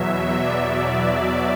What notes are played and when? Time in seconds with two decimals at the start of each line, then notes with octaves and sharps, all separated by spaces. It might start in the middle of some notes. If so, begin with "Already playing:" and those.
Already playing: E2 B2 F#3 E5
0.44 D5
0.86 D5